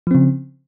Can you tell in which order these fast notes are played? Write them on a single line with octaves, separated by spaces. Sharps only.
F3 C4 C#3